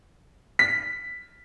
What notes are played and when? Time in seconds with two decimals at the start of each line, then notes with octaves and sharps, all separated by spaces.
0.59 B6